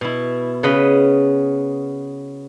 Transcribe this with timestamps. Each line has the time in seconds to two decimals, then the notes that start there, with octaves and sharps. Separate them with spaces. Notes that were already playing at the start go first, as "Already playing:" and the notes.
0.01 B2 E4
0.63 C#3 B3 B4 D#5 B5